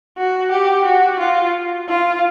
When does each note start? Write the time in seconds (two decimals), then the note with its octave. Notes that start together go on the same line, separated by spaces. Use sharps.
0.18 F#4
0.51 G4
0.85 F#4
1.19 F4
1.88 F4